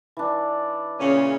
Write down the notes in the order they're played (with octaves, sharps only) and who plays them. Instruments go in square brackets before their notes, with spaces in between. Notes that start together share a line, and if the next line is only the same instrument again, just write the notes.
[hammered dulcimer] E3 D4
[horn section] A#2 C#3 C#4